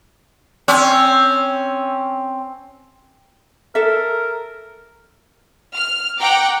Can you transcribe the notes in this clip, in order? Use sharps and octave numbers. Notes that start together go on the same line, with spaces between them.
C4 C#4
A4 A#4 E5
F6
F#5 G5 A#5 D6